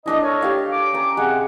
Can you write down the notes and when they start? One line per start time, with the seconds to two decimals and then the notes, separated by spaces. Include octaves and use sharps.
0.06 A3 D4 E4 D#5
0.22 A4 A#4 C#5
0.41 G4 F5 G5
0.71 D6
0.93 C#4 A#5
1.17 C3 G#3 C4 F#5